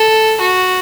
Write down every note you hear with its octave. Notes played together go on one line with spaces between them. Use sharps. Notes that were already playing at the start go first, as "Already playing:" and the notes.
Already playing: A4
F#4